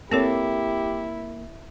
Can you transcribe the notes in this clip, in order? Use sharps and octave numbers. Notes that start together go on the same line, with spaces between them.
A#3 C4 E4 G4 A4 C#5